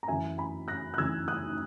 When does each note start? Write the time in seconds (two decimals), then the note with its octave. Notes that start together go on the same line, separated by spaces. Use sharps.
0.03 A#5
0.08 F#2 E3 E5 G#5
0.38 G#5 B5
0.68 F#6 A#6
0.94 F#6
0.98 F#2 E3 E6 G#6
1.28 D#6 F#6